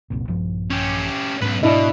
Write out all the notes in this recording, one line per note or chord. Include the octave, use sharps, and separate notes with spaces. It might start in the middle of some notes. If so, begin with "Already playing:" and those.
F#1 C2 A#2
A#1 G2 F3
C#4 G4
B1 G#2 C#4 D4 B4
G#2 B2 D4 E4 D#5